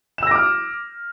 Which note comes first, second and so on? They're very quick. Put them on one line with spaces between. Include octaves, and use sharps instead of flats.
E7 E6 A#6 D6 F6